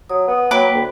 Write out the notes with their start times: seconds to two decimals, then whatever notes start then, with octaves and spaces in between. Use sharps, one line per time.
0.09 F#3 D#6
0.28 B3
0.51 F#3 A#3 B4 G5 D6
0.74 D2